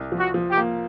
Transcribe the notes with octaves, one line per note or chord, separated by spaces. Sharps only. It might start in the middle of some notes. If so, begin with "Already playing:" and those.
Already playing: C2
F3
F#4
F3
G4
A#3